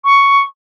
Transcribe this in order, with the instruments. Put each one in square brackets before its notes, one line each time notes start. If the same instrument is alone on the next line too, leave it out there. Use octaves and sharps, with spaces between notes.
[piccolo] C#6